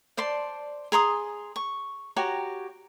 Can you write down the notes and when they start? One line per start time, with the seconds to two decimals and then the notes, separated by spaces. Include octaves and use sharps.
0.17 C5 D5 A5 C6
0.92 G#4 A#5 C6 D#6
1.56 C#6
2.16 F#4 G4 C#5 A#5